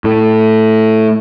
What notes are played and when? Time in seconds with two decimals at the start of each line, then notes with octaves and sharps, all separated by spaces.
0.04 A2